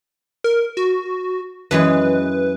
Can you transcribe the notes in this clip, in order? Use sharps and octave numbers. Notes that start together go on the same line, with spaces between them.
A#4
F#4
F#2 E3 G#3 B4